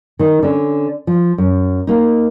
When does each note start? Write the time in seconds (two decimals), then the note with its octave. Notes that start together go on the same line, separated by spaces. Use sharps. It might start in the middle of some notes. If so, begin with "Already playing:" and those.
0.19 D#3 D#4
0.43 D3 C#4
1.07 F3
1.38 F#2
1.87 A#3 D#4